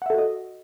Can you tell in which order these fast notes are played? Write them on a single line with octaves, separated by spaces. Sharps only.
F#5 E5 A4 F#4 D#5